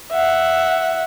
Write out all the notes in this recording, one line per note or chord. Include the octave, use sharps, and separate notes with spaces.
E5 F#5